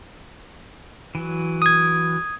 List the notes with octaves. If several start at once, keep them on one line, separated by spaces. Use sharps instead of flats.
E3 F#3
D#6 G#6